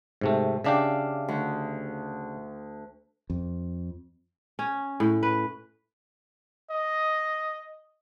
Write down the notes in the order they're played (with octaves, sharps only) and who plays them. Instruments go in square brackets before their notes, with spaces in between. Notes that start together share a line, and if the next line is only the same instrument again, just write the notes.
[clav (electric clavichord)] G#2 C3 A3
[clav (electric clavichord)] C#3 D4 G4 [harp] E5 F5 D6
[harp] D2
[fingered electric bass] F2
[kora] C#4
A2
B4
[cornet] D#5